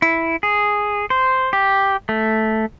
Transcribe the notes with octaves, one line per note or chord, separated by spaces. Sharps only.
E4
G#4
C5
G4
A3